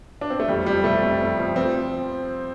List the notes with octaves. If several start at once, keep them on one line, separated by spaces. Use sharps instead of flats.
D4
C4
A3
F2 G3
F3 G3
C3 A3
F2
F2
F3
F3 C4